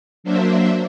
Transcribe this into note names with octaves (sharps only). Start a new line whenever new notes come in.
F#3 A#3 D4 C5 E5